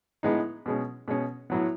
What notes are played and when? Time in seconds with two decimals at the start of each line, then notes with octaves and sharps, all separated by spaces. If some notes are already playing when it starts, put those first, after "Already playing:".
0.23 A2 G#3 B3 D#4
0.66 B2 G#3 C#4
1.08 B2 G#3 C#4
1.50 A2 F#3 B3